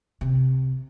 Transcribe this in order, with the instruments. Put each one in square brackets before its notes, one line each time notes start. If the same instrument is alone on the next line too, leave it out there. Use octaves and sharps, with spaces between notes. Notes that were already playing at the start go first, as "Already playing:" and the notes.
[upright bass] C3